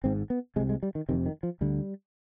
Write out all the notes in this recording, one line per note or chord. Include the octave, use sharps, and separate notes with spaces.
G#1 G#2 C4
B3
C2 C3 G#3
G#3
G3
D#3
F1 F2 C3 D#3
D#3
F3
D2 D3 G3